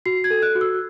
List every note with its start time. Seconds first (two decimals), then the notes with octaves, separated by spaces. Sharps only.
0.06 F#4 C7
0.24 G#6
0.30 A4
0.42 F#6
0.55 F#4
0.61 E6